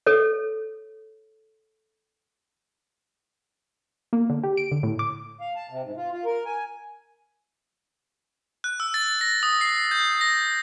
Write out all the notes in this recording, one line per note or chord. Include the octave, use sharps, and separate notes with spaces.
A4 C#5
A#3
D3
G4
D7
D3
A2
D6
F5
A5
C3
G#2
F4
F4
A#4
G#5
F#6
E6
A6
A#6
D#6
C7
G6
A#6